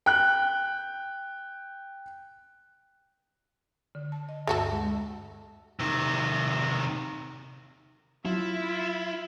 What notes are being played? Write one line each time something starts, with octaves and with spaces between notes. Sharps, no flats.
G5 F#6
D3
A5
D#5
D2 G2 A3 F#4 A4
G#3
C3 D#3
F#3 E4 F4 E5